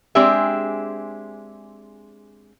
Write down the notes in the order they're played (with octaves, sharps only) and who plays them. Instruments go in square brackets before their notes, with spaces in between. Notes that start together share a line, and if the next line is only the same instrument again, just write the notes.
[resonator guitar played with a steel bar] G#3 C4 D4 G4 G#4 E5